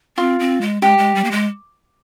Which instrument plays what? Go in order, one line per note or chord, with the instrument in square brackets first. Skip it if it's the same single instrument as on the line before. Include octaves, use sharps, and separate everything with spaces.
[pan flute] C4 [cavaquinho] F4
[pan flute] C4
G#3
[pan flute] G#3 [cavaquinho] G4
[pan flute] G#3
G3
A#3
G#3